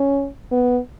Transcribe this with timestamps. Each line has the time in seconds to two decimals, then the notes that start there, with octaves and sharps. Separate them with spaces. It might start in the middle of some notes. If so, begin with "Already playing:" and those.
Already playing: C#4
0.52 B3